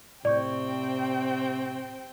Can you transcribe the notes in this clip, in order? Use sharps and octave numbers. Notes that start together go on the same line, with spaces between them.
A2 C3 C4 D5 G5 C#6 G6